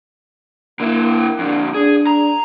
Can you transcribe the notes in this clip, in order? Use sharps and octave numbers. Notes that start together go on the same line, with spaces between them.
D3 A#3 E4
F2 D3 D4
D4 G#4
A#5